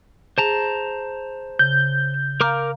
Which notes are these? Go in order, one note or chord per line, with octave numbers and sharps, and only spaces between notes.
G#4 C5 A5 A#5
C#3 G6
A#4 F5 A#5 D6 F6